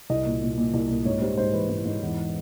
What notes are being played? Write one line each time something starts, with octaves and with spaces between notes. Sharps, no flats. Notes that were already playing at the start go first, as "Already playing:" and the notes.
C2 D#5
A#2
A#2
A#2
C2
A#2
G#2 C#5
G3 C5
G#2 C5
E3 B4
G#2
G#2
E2